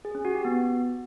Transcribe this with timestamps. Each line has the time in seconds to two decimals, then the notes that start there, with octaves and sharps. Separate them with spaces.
0.05 G#4
0.15 C#4
0.25 F#4
0.35 G4
0.45 B3